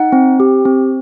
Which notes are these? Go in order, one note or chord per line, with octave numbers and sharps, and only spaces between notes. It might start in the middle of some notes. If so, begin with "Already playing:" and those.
Already playing: D#4 F#5
C4
G4
C4